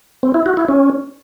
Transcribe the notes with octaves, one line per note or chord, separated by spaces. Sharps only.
C4
E4
F#4
E4
C#4